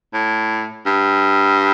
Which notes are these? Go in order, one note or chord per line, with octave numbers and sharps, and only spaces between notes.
A2
G2